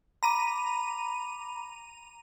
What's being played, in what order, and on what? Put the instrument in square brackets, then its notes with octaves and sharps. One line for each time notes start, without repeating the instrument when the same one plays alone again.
[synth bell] A#5 D#7 [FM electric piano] B5 D6